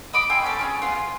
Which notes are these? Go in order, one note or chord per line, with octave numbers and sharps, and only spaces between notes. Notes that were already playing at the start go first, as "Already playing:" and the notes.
D#5 B5 D6 D#6
G5 G#5 C6 E6
B3 C#4 A4
C#4 F4 G#4
B3 F4 C6
F4